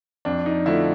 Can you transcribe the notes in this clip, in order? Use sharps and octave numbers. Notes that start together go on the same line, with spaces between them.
F2 D4
D#4
D3 F3 A3 E4